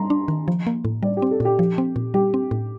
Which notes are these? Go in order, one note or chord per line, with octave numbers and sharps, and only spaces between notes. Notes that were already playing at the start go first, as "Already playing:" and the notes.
Already playing: G3 A#5 C6
D4
D#3
F3
A#3
A2
G3 D5
G4
C4
A4
A#2 G4
F3
C4
A#2
G3 G4
C4
A2